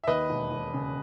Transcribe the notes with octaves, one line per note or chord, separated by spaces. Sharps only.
E5
D#2 B4 D#5
E1
E1
C#3